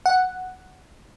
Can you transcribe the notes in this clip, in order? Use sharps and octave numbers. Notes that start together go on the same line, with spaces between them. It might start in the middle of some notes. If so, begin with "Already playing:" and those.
F#5